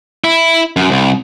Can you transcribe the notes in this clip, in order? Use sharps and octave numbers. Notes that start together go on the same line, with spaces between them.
E4
F#2
C2